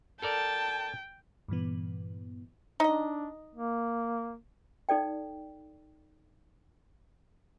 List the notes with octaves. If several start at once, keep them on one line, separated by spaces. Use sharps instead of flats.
A4 A#4 D5 G5 A5
G2 A#2 E3 B3
D4 D#4 D#5
A#3
D#4 A4 D5 G5